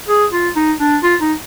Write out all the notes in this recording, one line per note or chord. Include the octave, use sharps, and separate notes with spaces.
G#4
F4
D#4
D4
F4
D#4